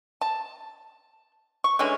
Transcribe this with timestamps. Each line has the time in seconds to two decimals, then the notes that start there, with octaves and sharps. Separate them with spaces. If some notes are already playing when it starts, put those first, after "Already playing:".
0.21 A5
1.64 C#6
1.79 D3 E3 G#3 C#4